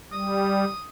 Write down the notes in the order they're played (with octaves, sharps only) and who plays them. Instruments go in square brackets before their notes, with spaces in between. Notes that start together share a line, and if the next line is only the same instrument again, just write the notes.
[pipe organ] G3 [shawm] D#6